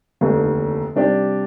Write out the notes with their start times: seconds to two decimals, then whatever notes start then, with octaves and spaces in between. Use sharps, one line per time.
0.21 F1 D#2 D3
0.96 C3 G3 D4 G4 D5